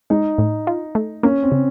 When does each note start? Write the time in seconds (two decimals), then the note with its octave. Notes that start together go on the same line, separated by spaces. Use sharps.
0.10 G#3 D#4
0.38 A2
0.67 F4
0.95 A3
1.23 A#3 C#4
1.43 C4
1.52 C#3